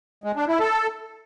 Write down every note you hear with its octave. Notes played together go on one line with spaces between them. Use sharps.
G#3
D4
E4
A4